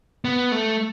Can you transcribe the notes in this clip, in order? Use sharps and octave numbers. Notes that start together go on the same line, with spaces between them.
B3
A3